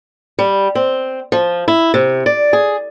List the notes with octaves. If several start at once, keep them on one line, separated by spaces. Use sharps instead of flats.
G3
C4
F3
E4
C3
D5
G#4